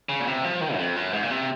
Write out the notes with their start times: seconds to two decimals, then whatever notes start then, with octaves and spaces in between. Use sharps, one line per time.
0.09 C#3
0.20 A#2
0.27 C3
0.44 F3
0.61 D#3
0.74 F#2
0.79 F2
0.96 F#2
1.13 G#2
1.23 A#2
1.31 C3